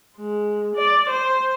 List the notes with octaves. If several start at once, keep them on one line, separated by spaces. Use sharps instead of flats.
G#3
D5
C5